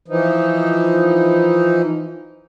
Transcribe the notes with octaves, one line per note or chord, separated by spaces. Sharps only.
E3 F3 D#4